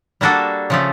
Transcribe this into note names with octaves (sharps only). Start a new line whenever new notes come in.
G3 A#3 D4 F#4 A4
C#3 F3 A3